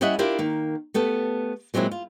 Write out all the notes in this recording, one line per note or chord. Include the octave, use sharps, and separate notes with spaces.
G3 C#4 E4 D#5 E5 F#5
D4 E4 F4 G4 A#4
D#3 A#3
A3 B3 G4 A4
A#2 F#3 G#3 C4 E4
F4